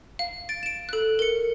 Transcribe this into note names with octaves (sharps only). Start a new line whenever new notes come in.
F5
A6 D7
D7 E7
A4 F#6
A#4 C#7